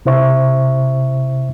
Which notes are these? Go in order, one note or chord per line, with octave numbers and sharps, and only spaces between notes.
C3 E4 C5 E5 C#6